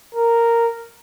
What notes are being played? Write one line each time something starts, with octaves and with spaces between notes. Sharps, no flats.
A#4